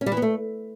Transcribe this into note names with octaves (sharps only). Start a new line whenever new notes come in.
C#4
G3
E3
B3
A3